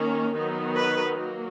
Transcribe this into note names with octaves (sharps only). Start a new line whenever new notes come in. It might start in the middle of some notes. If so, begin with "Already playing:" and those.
Already playing: D#3 A#3 C#4
D#3 F#3 B3 D#4
B4
F#3 A#3